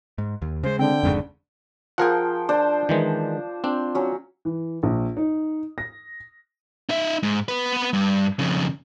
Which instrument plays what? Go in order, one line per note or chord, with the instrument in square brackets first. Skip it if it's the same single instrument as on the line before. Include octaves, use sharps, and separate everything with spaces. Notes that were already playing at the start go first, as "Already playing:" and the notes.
[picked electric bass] G#2
D#2
[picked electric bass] C#3 G#3 [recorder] C5
[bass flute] D3 [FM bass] C4 [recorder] G5
[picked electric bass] F#1 G#2 C#3 [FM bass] F2
[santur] F3 G5 [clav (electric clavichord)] G#4 A#4 F#5
[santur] D4 C5
[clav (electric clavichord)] D#3 E3 G#3
[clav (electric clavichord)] C4 D4 [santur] C6
[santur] F#3 C#4
[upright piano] E3
A#1
D#4
A#6
[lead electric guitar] D#4 E5
G#2
B3 B4
G2
F2 C#3